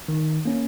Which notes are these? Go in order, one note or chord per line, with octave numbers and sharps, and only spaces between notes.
D#3
A#3 C#4